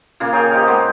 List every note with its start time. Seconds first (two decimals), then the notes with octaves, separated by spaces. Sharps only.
0.20 A#2 C#3 A#3
0.32 G#4 A#4 C#5 G5
0.53 G4 C5 D#5
0.68 G#3 B3